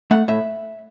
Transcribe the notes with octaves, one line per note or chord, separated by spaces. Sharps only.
A3 F#5
A2 E5